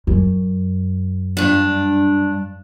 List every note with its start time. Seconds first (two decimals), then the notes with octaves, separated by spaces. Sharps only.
0.07 F#2
1.37 G2 D4